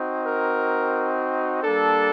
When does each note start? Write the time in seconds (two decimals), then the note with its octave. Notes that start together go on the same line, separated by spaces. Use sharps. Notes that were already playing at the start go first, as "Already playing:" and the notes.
Already playing: C4 D#4 F#4
0.25 A#4
1.63 G3 A#3 D4 A4